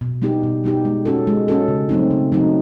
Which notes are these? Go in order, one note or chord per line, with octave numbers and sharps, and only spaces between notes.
B2
G3 B3 D#4 G4
B2
G3 B3 D#4 G4
G#3
C#4 F#4 A4
G#3
C#4 F#4 A4
C#3
F#3 A3 C4 D#4
C#3
F#3 A3 C4 D#4